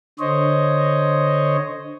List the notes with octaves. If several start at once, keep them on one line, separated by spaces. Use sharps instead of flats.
D3 C5 C#5 D#5